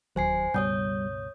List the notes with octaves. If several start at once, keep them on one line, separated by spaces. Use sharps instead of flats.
E1 D#2 F#3 C5 G#5 C7
C#2 G2 B2 G3 C#5 D#6 G6